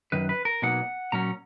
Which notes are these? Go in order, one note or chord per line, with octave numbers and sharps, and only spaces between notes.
F#2 D#3 B4
B4
A#4
B2 F#3 A#3 D#4 F#5
A#2 F#3 C#4 A#5